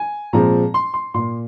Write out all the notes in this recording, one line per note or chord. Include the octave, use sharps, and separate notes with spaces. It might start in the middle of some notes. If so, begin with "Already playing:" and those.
Already playing: G#5
A#2 F3 G#3 C4 A#5
C6
C6
A#2 A#3 C6